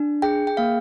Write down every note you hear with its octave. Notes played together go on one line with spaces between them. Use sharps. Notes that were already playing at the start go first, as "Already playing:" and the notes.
Already playing: D4
G#4 G5
G5
A#3 F5